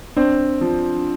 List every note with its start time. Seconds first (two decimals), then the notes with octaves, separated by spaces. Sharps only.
0.17 C4 D4
0.61 F3